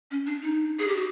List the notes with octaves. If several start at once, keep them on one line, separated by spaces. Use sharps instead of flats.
C#4
D4
D#4
G#4
G4
F#4